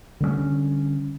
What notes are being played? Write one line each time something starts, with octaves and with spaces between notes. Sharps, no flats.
D3 G3 A3 C#4